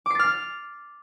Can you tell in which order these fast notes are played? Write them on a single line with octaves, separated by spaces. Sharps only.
D6 C7 A6 F6